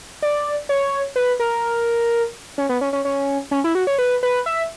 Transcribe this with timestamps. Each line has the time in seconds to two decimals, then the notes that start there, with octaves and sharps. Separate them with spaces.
0.22 D5
0.69 C#5
1.16 B4
1.40 A#4
2.58 C#4
2.69 B3
2.81 C#4
2.93 C#4
3.05 C#4
3.51 C#4
3.64 E4
3.75 F#4
3.87 C#5
3.98 B4
4.23 B4
4.46 E5